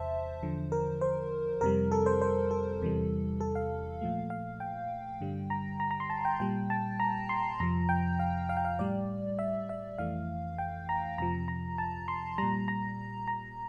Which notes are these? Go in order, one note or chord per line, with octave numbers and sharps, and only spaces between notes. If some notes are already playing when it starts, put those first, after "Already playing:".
Already playing: E2 C3 C5 E5 A5
E2 D3 F3
A#4
C5
F2 C3 G3 A#4
A4
C5
C5
A4
E2 C3 E3 G3
A4
F5
A#2 F3 A3
F5
G5
G2 D3 G3
A#5
A#5
A#5
C6
A5
G5
A#2 G3 G5
A5
A#5
C6
F2 C3 F3 A#5
G5
F5
F5
G5
F5
A2 G3 D5
E5
E5
F2 E3 A3 F5
G5
A#5
F2 C3 F3 A#5
A#5
A5
C6
A#2 G3 A#5
A#5
A#5